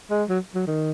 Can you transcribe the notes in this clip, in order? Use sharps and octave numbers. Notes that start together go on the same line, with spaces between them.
G#3
F#3
F#3
D#3